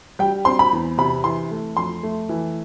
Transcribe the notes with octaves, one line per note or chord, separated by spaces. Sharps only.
G3 G5
C4 C6
B5
E2
C3 B5
E3 C6
A3
F2 C6
A3
E3